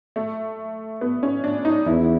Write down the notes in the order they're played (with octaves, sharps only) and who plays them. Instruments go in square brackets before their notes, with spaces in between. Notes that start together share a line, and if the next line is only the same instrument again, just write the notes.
[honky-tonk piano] A3
B3
C#4
D4
D#4
[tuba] E2 [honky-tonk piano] E4